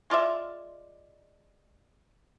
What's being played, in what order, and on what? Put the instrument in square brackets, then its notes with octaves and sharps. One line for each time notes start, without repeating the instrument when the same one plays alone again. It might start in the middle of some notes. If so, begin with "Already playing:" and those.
[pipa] G#3 F4 D5 E5